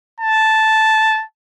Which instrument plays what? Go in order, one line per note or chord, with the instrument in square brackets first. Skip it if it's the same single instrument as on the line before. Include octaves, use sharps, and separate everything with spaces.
[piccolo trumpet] A5